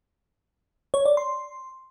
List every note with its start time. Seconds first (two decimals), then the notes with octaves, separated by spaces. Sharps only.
0.94 C#5
1.06 D5
1.17 C6